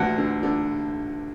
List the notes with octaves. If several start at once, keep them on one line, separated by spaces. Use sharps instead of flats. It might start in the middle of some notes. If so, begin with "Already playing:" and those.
Already playing: A1 D2 F#5
D3
D3